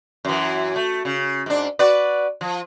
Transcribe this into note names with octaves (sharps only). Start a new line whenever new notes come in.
F#2 E3
A3
C#3
G#2 D4
F#4 B4 D5
F3